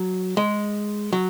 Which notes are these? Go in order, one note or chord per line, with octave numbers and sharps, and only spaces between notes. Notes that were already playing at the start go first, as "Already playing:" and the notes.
Already playing: F#3
G#3
F#3